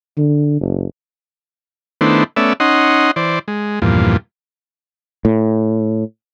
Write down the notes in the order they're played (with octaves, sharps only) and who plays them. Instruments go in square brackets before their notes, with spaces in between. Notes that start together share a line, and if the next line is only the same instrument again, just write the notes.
[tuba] D3
F#1
[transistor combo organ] D#3 A3 B3 D4 E4 C5
A3 B3 C#4 D5 E5
C#4 D#4 D#5 F#5 C6
E3 C5 D5
G#3
E2 G2 A#2 F3
[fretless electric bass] A2